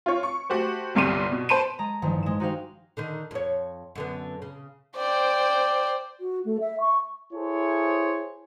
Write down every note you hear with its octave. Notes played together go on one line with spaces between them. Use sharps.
F4 C#5
C#6
A3 F#4 G4 C5
G1 C2 G2 G4 C6 D#7
B2
C5 A5 B5 D7 D#7
G#3 A4 A#5
A1 G2 D#3 F3
G#3 E7
D#4 F#4 G4 C5 F5 G5
D3 D#3 D#4
F2 C#5
F#2 D3 B3
C#3
C5 D5 G5
F#4
A3
E5
C#6
E4 G#4 A4 C5 C#5